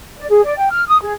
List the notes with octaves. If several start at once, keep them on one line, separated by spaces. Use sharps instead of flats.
D5
G#4
D5
G5
F6
D#6
G#4